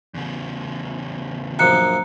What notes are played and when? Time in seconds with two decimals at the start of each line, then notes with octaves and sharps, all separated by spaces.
0.14 E2 C#3
1.59 A#1 F#2 F3 A#5 F#6 C#7